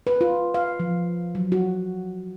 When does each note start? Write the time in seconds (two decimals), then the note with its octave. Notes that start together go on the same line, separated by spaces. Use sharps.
0.07 B4
0.21 F4
0.54 F5
0.80 F3
1.35 F#3
1.52 F#4